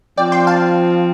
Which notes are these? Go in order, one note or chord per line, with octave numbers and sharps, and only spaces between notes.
F3 C4 F4 D5 G5
G5 C6
F5 A5